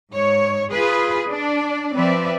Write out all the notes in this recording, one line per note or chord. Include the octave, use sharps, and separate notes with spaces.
G#2 C#5
F4 G#4 B4
D4 D5
F3 C4 B4 D5 E5